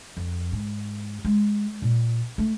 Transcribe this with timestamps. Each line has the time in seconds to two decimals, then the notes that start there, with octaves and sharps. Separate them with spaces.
0.17 F2
0.52 G#2
1.25 G#3
1.82 A#2
2.38 A3